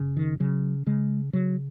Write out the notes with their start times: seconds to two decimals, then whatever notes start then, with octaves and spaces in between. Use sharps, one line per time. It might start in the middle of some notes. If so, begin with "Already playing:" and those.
Already playing: F#1 C#3
0.17 D#3
0.40 C#3 F#3
0.87 C#3 G#3
1.33 C#3 F#3